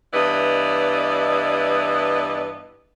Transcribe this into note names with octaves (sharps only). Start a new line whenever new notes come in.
G2 E3 B3 D5 D#5